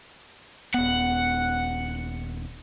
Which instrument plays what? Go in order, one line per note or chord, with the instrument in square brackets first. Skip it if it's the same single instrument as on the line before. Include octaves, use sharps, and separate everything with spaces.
[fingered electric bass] D#1 B3 [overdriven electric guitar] F#5